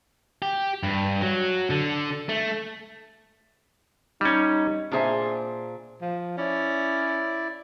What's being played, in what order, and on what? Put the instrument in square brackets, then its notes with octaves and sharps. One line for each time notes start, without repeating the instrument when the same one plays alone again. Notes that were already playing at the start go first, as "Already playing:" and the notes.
[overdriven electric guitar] G4
G2
F#3
D3
A3
[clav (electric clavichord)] G3 C#4 [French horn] D#4
[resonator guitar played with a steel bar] A#2 D4 G#4 C5 E5
[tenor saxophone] F3
[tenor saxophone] C#4 [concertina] E4 D5